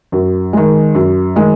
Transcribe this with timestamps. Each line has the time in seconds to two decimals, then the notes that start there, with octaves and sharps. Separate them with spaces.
0.12 F#2
0.53 D#3 G#3
0.95 F#2
1.36 D#3 G#3